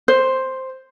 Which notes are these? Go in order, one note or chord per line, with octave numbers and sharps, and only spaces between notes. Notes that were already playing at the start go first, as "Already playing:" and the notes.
C5